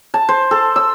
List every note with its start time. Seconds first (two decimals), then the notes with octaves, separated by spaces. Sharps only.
0.14 A5
0.29 C5
0.51 A4
0.76 E6